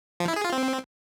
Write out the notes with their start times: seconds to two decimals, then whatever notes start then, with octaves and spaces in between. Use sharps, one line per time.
0.20 F3
0.28 E4
0.36 G#4
0.44 F4
0.53 C4